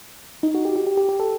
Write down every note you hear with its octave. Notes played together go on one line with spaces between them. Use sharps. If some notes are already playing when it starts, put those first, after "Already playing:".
D#4
F#4
G4
G4
G4
G4
G4
A4